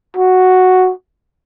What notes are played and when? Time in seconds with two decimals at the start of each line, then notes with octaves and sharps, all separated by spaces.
0.16 F#4